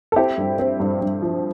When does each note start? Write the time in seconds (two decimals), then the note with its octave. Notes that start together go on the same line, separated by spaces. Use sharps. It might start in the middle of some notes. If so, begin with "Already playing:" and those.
0.12 A4
0.16 C4 E4 G4
0.38 G2
0.59 C4
0.80 G2
1.01 G2
1.22 F3